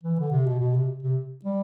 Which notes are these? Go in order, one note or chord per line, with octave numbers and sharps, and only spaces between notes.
E3
D3
C3
B2
B2
C3
C3
G3